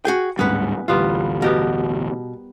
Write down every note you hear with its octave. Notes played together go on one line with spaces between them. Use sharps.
F#4 G#4 G5
D1 G#2 G3 B3 C#4 B4 F#5
A1 D2 G3 B3 F4
B2 B3 G4 A#4